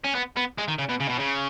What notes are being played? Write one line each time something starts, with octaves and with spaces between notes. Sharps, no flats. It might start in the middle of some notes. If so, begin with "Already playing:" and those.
C#4
B3
B3
G#3
D#3
C#3
B2
C#3
B2
C#3